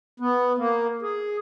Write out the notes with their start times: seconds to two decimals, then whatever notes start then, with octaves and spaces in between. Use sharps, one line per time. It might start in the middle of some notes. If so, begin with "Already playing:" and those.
0.20 B3
0.58 A#3
1.02 G#4